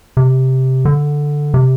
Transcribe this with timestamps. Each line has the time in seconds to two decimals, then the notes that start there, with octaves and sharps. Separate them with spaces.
0.17 C3
0.85 D3
1.54 C3